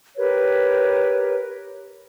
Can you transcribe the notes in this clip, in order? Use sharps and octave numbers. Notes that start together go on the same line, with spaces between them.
G4 A#4 B4 C#5